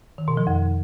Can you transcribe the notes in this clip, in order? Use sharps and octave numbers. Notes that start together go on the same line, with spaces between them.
D#3
B2
F3
F2